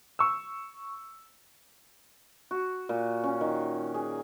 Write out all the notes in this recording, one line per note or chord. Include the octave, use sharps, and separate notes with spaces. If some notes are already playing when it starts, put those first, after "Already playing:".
C#6 E6
F#4
A#2
C#4
D#3
G#4